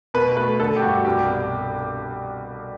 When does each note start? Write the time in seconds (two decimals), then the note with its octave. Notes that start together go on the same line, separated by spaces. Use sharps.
0.14 B2 B4
0.36 A3 B4
0.60 D3 A4
0.76 G4
0.82 G2 F#4
1.05 C2 G4
1.29 B2